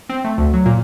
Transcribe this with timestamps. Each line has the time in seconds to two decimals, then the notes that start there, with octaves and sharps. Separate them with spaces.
0.09 C4
0.24 A3
0.38 D2
0.53 F#3
0.66 A#2